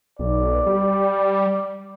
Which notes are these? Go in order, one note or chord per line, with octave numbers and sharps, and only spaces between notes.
B1 D5
G3